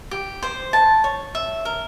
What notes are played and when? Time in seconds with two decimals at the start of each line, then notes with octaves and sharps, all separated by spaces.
0.11 G4
0.43 C5
0.73 A5
1.04 C#5
1.35 E5
1.65 A#4